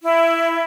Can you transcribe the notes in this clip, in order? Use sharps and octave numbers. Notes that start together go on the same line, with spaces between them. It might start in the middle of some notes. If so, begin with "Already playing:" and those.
E4